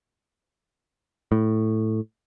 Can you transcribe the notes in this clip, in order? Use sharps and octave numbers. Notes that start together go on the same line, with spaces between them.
A2